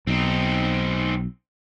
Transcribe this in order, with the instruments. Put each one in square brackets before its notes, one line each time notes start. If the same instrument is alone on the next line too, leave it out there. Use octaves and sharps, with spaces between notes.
[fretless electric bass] B1 [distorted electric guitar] C4 D#4